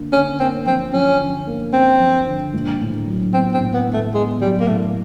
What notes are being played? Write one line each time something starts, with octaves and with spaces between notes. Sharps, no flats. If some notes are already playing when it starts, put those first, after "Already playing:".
Already playing: D3 A#3
D3 C#4
A#3 C4
F3 C4
F3 C#4
D3
A#3
C4 C#4
F3
D3
A#1
A2
F#3
B3 C4
C4
A2
B3
A2
A3
G#3 B3
F#3 G3
A#3
A2 A3